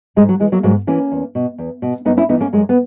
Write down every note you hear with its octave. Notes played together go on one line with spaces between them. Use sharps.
G#2 G#3
F#3
E3 G#3
F#3 A#3
G#2 F#3 A#3
E3 A#3 C#4
E2
B2
E2
B2
F#2 B3 D#4
C#4 E4
E3 B3 D#4
A#3 C#4
F#2 G#3
B3